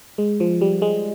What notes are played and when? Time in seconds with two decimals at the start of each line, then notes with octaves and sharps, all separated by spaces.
0.18 G#3
0.40 F3
0.61 G3
0.82 G#3